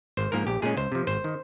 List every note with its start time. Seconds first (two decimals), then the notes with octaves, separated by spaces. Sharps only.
0.17 G#1 C5
0.32 G#2 F3 A#3 A#4
0.47 A#1 G4
0.62 A#2 G#3 C#4 G#4
0.77 C#2 C5
0.92 C3 F3
1.07 G#1 C5
1.24 D#3